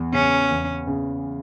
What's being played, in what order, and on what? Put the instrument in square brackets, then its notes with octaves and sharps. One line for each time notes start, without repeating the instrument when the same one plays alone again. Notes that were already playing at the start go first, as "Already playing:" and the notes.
Already playing: [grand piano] E2
[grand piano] C#3 [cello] C#4
[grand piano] E2
C#3